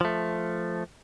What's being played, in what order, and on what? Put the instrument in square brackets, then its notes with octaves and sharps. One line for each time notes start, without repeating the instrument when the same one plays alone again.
[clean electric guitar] F3 A3